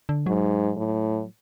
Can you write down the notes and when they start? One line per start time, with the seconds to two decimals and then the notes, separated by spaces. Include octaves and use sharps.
0.09 D3
0.26 G#2 F#3
0.77 A2